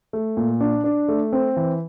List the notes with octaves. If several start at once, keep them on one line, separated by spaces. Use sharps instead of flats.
A3
A#2
D4
D4
A3
C4
E3